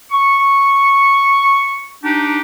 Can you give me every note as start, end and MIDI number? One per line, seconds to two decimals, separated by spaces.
0.12 1.91 85
2.03 2.41 62
2.03 2.41 63
2.03 2.41 67